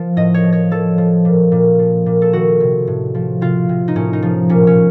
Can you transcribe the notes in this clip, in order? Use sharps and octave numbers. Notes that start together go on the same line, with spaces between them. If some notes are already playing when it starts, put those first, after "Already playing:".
Already playing: F3
A2 D#5
C#5
F3
C#5
F3 A4
F3
A#2
A#2
F3
A#2
A4
D#3 F#4
C3
A2
F3
C3 F4
C3
D#4
A2 C#4
D#4
F3
A#2 C#4
C#4